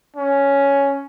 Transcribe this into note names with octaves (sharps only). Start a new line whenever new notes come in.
C#4